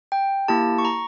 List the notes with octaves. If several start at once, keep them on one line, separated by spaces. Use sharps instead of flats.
G5
A#3 E4 G4 A5
C#6
A#5